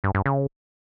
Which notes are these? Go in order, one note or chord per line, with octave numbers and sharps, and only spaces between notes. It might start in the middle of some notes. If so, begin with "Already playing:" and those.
G2
G2
C#3